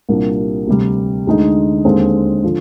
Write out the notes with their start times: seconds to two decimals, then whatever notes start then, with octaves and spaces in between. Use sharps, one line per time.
0.09 C2 A#2 G3 A#3 D4
0.67 D2 C3 G3
1.27 D2 D3 G#3 D#4
1.85 D#2 D3 G#3 C4
2.44 D3 F3